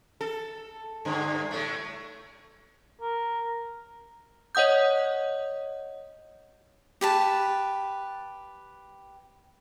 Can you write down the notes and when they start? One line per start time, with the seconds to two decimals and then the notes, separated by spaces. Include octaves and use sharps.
0.21 A4
1.05 G2 D3
1.51 A2 A3
3.01 A#4
4.55 C#5 D#5 F#5 D#6 G6
7.01 G4 B4 A5